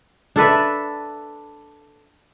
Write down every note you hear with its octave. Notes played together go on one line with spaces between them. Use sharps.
D4 A4 B4 E5